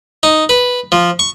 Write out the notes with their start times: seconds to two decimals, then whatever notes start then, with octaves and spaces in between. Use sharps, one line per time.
0.23 D#4
0.49 B4
0.92 F3
1.19 C#6